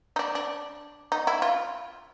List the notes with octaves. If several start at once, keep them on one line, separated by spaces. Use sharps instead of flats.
D#4
D4
D4
D#4
E4
F4